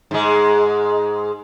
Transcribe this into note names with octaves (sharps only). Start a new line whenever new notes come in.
G#2 G#3